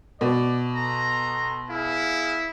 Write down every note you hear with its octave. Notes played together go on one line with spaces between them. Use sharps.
B2 D5
B3 A4 A#5 C6
B3 E4 G#4 F5